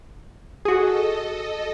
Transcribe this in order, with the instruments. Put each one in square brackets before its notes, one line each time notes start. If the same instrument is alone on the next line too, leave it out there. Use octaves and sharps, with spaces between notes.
[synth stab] F#4 G#4 [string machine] A4 D#5